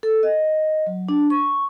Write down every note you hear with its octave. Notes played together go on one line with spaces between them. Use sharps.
A4
D#5
F#3
D4
C#6